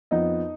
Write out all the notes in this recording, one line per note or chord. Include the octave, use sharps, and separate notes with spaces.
F2 F3 B3 D#4 D#5